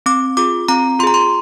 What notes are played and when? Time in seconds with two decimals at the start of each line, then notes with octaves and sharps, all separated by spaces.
0.06 C4 D6
0.37 F4 G#4 D6
0.68 C4 A#5
0.99 F4 C6
1.03 G#4 A#5
1.14 C6